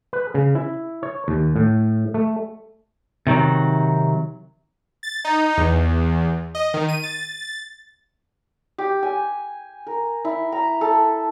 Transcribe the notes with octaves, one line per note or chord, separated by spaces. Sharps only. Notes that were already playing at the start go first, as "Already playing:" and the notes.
B4
C#3
E4
C#5
D#2
A2
A3
C3 D#3 F#3
A6
D#4
E2
D#5
D#3
D#7
A6
G4
G#5
A#4
E4
A#5
A4